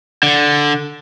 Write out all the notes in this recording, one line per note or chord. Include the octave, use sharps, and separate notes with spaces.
D3